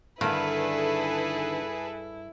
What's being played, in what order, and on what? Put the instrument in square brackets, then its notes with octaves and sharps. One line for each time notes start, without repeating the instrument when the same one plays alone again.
[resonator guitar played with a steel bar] G2 [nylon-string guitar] D3 D#3 [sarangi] E4 [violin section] G#4 A4 B4